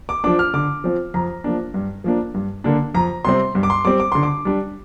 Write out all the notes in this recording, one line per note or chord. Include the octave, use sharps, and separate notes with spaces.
D6
F3 D4 D6
F6
D3 D6
F3 C4
F2 A#5
F3 A#3 D4
G2
F3 A#3 D4
G2
D3 A#3 D4
F2 A#5
C3 G3 C4 C6
G2
D6
C6
G3 C4 D6
D6
D3 C6
D6
G3 D4